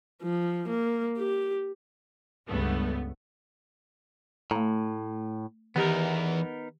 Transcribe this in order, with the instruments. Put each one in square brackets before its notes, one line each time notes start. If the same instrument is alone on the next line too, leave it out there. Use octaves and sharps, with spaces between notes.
[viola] F3
A#3
G4
[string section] C#2 G2 A3 B3
[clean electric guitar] A2 [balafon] A3 A#5
[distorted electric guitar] E2 [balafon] D#3 G4 [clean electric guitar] B3 D#4 A#4